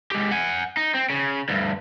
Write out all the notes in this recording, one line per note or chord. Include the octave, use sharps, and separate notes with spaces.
G#3 G4
F#5 G#5
D#4
C4
C#3
D2 G2